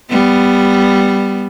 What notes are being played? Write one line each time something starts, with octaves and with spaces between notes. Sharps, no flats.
G3 B3